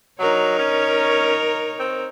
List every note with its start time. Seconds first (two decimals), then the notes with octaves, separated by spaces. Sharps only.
0.19 F#3 D#4 A#4 C#5
0.59 C#4
1.79 C4